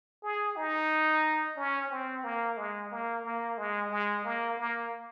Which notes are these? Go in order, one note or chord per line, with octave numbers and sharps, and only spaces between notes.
G#4
D#4
C#4
C4
A#3
G#3
A#3
A#3
G#3
G#3
A#3
A#3